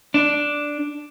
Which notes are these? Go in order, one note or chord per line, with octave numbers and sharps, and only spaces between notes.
D4